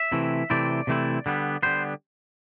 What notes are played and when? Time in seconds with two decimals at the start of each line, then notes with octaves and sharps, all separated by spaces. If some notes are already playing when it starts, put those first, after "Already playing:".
Already playing: E5
0.12 C3 E3 A3 C4 E4
0.50 C3 E3 A3 C4 E4 D5
0.87 C3 E3 A3 C4 E4
1.26 D3 G3 B3
1.63 D3 G3 B3 C5